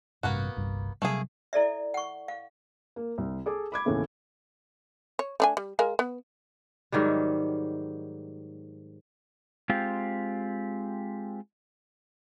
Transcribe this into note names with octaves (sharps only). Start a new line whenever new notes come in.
A1 G2 C3 A#3 B3 F#4
G1 C2 G2
C3 F#3 G3 A3 A#3 G#4
E4 A4 D5 E5
F#5 C#6
F5
A#3
C2
G#4 A4 D6
B5 D6 G#6
D#2 A2 C#3 E3 A3 B3
C#5
A3 D4 G#5
G3
G#3 A#4 F5
B3
G#2 D#3 F#3 G3
G#3 C4 F4 G4